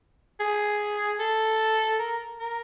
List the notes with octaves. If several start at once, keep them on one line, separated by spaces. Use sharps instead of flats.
G#4
A4
A#4
A#4